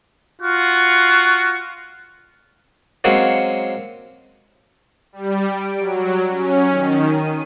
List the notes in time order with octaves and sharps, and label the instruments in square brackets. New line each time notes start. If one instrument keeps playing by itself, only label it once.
[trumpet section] F4 F#4
[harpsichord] F#3 G#3 A#3 C4 C#4 F#4
[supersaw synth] G3
D7
F#3
C#4
D#3
D#7